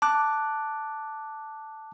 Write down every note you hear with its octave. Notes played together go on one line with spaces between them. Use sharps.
A5 D6 F#6